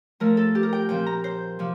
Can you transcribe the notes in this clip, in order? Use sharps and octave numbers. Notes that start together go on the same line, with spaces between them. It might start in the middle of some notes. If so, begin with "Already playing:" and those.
A2 F3 A3 A#4
A4
G4
A#4
G5
A#2 F3 C4 G5
A#5
C5
C3 F3